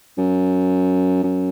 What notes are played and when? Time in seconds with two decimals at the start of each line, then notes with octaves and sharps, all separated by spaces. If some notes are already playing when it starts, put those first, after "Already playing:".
0.18 F#2
1.23 F#2